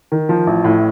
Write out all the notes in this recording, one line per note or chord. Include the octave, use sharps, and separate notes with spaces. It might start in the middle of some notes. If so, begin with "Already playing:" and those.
D#3
F3
A1
A2